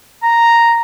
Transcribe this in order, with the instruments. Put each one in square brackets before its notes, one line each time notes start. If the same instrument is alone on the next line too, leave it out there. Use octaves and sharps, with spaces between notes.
[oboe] A#5